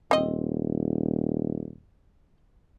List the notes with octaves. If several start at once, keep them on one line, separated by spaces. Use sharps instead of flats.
D#1 C4 D#5